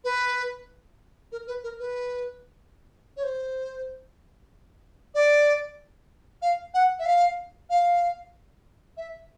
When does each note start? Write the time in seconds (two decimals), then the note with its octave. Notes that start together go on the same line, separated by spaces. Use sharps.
0.04 B4
1.32 A#4
1.47 B4
1.64 A#4
1.80 B4
3.17 C#5
3.24 C5
5.15 D5
6.42 F5
6.74 F#5
6.99 E5
7.06 F5
7.70 F5
8.97 E5